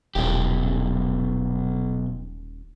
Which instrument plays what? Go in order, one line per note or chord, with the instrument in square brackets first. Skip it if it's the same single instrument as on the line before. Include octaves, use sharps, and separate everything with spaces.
[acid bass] D#1 [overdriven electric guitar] B1 G4